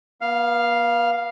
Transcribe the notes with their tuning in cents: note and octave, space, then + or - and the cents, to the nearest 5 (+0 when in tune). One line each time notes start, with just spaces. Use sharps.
B3 -45 F5 +0